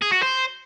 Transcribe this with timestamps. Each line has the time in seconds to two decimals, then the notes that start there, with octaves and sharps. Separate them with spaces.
0.02 G#4
0.12 F#4
0.22 C5